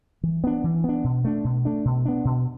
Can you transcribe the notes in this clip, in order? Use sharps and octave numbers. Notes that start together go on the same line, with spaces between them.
E3
B3 D4
E3
B3 D4
B2
A3 D4
B2
A3 D4
B2
B3 D4
B2